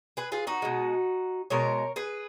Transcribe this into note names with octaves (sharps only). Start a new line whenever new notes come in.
G#4 B4
F4 G#4
D#4 F#4
B2 G#3
B2 G#3 A#4 C#5
G#4 B4